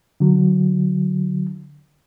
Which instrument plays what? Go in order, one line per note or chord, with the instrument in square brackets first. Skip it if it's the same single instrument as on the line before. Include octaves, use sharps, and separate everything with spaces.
[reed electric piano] D3 F#3